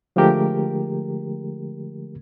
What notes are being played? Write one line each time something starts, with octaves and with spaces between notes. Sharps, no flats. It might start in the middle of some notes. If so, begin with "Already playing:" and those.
D3 F3 G#3 A3 G4 A#4